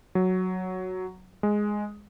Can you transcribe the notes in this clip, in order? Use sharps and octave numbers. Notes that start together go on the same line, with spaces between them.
F#3
G#3